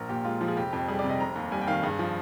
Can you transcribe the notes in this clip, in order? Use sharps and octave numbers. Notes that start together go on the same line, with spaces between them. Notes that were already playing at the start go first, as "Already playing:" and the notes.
Already playing: A#1 A#4
A#2 G4
G#3 F4
F3
G#4
F1 G4
F2
G3 G#4
D5
C3
D#5
F1 A#5
D#2
G3 G#5
G5
D#3 F5
G2 G#4
F3